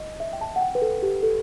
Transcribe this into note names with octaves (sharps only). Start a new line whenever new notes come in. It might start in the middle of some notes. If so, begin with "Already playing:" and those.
Already playing: D#5
E5
G5
A5
F#5
G5
B4
A4
G4
A4